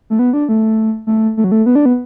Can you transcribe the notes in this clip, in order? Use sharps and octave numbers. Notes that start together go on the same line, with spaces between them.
A3
B3
D4
A3
A3
A3
F#3
A3
B3
D4
B3